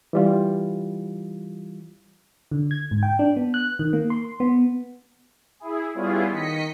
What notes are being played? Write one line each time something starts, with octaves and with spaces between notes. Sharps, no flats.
E3 G3 F4
D3
G#6
G#2
G5
D4
B3
F#6
D#3
A#3
C6
B3
E4 G#4
G3 B3 C#4 E4 F4 G#4
D#3 D#5 B6 C#7